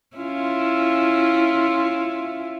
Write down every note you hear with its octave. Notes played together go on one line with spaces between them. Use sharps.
C#4 E4 F4